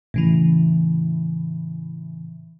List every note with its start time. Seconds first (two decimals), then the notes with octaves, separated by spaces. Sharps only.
0.14 A2 C#3 E3